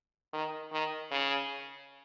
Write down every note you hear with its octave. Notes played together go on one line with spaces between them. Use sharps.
D#3
D#3
C#3